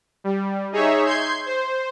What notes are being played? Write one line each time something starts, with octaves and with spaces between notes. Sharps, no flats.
G3
D#4 G#4 C#5 E5
C6 G6 G#6 C7
C5